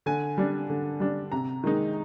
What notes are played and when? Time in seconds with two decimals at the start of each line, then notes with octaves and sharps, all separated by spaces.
0.06 D3 G#5
0.38 G3 D4
0.70 D3
1.00 G3 D4
1.32 C3 A#5
1.64 D#3 G#3 D#4